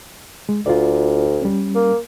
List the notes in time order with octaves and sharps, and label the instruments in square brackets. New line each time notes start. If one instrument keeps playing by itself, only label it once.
[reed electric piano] G#3
[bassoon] D2 [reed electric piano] F4 D5
[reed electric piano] G3 C#4
[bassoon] A#3